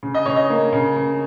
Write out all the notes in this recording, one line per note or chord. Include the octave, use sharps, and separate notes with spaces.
C#3
D#5
C#3 C#5
D#5
A#3
C#3
C#3